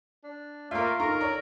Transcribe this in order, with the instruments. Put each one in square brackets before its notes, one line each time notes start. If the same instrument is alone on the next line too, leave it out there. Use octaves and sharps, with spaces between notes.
[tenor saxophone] D4
[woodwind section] A3 A#3 [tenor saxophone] F4 [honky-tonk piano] A#4 E5
[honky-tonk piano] D#4 A#5 C#6 [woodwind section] A4 A#4
[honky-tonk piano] C#5 D5 A#5